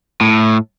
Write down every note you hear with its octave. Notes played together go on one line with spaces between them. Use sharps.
A2